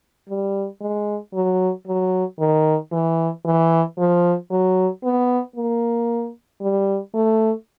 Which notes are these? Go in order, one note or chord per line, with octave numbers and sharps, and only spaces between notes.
G3
G#3
F#3
F#3
D#3
E3
E3
F3
F#3
B3
A#3
G3
A3